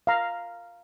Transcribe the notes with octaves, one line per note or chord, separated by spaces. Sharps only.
F5 A#5